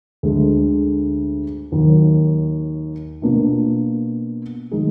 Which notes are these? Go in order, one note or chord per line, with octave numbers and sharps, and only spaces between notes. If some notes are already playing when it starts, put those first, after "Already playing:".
D2 D3 G#3
D#2 D#3 F#3
B2 A#3 D4 F4
D#3 G#3 D#4 G#4